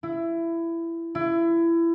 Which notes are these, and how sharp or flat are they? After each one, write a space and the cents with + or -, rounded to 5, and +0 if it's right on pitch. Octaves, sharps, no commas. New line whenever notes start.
E4 +20
E4 +25